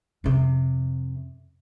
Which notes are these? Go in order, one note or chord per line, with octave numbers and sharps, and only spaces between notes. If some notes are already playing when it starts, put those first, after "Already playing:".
F2 C3